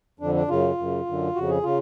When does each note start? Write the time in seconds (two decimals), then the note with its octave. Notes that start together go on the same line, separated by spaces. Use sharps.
0.20 F2 D3 D4
0.34 D4
0.48 F#2 C#3 F4
0.78 F#2 C#3
1.06 F#2 D3
1.35 F2 C#3 F#4
1.50 G#4
1.63 C#3 F4